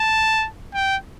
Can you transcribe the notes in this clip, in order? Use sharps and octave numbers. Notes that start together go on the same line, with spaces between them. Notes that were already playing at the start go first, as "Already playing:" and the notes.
Already playing: A5
G5